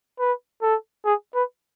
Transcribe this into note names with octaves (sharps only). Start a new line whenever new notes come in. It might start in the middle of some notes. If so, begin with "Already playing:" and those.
B4
A4
G#4
B4